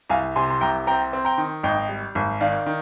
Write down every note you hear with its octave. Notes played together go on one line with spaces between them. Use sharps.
C2 F5 G#5
C3 G#5 C6
C6
C2 G5 A#5
C4 G5 A#5
C4
G5 A#5
D#3
G#1 D#5 G5
G3
G#1
D#3 D5 F5
D#3